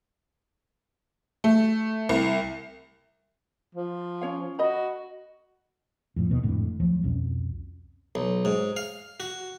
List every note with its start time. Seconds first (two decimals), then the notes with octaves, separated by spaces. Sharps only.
1.44 A3
2.09 C2
3.75 F3
4.21 C#4 C#5 F5
4.59 F#4 D#5 B5
6.16 F2 A2
6.30 D#2 B2
6.43 G#1 F2 A2 D3
6.79 D2 F3 F#3
7.03 C2 F2 B2 C#4
8.15 B1
8.45 G#2
8.76 F5
9.20 F#4